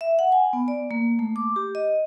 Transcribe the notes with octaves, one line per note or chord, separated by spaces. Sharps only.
E5
F#5
G#5
B3
D5
A#3
A3
D6
G4
D#5